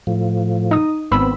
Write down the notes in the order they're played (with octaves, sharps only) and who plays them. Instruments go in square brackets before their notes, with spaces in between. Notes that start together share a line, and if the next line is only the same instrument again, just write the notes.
[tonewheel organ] A2 F3
[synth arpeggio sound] D#4 D#6
[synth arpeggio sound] G#1 B5 E6 [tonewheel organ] B3 C4